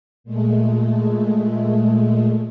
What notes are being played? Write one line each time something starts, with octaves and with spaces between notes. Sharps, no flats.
A#2 G#3 A3